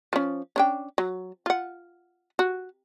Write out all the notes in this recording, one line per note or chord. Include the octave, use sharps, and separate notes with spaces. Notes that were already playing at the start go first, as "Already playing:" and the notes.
F3 C#4
C#4 D4 G5
F#3
F4 F#5
F#4